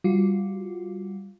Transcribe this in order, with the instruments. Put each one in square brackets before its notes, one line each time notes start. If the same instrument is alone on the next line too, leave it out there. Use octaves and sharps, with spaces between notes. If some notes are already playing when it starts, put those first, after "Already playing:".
[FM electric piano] G3 F4 F#4